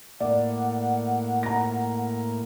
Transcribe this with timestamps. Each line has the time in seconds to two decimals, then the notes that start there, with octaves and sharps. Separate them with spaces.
0.20 A2 A#3 D5 F#5
1.43 A#5 A#6